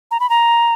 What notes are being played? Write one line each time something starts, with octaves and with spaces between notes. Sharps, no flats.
A#5
B5
A#5